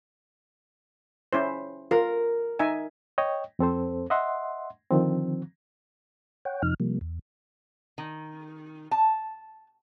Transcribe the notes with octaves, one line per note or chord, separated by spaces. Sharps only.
C#4 E4 C5
F4 A#4
D#4 E5 G#5
C#5 D#5 G5
F2 C4 A4 C5
D#5 E5 F#5 C6
D3 D#3 F3 C4
C#5 F#5 G5
F2 C3 F3 D#4 F6
C3 F3 G3 A#3
E2
D#3
A5